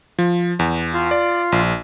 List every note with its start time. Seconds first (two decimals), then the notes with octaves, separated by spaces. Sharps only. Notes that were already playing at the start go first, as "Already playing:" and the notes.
0.19 F3
0.59 E2
0.93 F4
1.11 D5
1.52 A#1